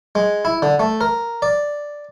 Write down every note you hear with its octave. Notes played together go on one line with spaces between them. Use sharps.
G#3
E4
D3
A3
A#4
D5